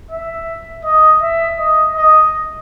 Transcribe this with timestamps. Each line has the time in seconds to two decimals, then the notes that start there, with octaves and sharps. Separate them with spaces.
0.11 E5
0.85 D#5
1.22 E5
1.59 D#5
1.95 D#5